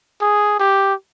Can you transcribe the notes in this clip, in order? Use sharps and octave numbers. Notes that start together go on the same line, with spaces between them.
G#4
G4